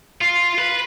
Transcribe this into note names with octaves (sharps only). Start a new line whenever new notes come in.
F4
B4